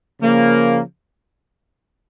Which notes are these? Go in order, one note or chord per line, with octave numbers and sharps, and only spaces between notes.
C#3 F3 A#3